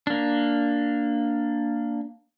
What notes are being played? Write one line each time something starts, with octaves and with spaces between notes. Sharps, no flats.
A#3 D4